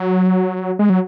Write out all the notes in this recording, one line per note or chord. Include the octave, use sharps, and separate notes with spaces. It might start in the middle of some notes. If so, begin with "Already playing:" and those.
Already playing: F#3
G#3
F#3